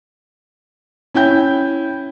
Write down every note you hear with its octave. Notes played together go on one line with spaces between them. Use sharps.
C#4 E4 G5 G6